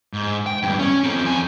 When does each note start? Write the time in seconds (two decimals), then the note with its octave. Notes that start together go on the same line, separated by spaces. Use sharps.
0.13 G#2
0.46 G5
0.63 E2 G2
0.79 C#4
1.04 C4 A4
1.23 F2 G#5